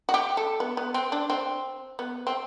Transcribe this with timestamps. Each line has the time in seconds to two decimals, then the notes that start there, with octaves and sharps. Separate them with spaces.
0.09 F#4
0.14 G4
0.37 A4
0.60 B3
0.77 B3
0.94 C4
1.12 D4
1.30 C4
1.99 B3
2.27 C4